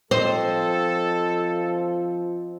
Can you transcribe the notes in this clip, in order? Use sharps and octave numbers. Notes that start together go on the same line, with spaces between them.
F3 C4 A4 C5 D#5